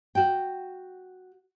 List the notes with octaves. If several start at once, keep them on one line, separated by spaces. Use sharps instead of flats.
F#4 G5